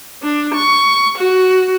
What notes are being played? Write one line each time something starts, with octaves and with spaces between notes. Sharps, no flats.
D4
C#6
F#4